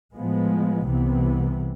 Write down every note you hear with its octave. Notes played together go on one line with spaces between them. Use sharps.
A2 F3 G#3 B3
C2 C3 E3 B3